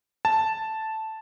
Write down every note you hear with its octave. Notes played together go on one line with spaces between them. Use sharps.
A5